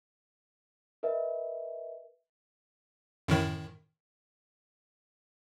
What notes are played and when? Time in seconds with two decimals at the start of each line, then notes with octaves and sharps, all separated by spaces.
1.03 A#4 B4 D#5 E5
3.28 F#2 A2 D#3